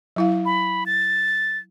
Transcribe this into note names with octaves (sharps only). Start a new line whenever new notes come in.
F#3 E4 F5
B5
A6